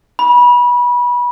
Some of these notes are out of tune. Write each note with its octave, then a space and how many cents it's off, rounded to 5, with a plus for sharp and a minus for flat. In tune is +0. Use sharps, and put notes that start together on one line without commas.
B5 -25